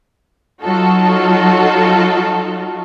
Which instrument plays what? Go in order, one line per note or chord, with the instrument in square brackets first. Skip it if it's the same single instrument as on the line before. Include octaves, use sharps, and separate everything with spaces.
[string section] F#3 D#4 F4 F#4 A4